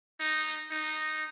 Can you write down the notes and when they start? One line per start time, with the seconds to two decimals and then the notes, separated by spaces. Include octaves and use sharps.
0.20 D#4
0.71 D#4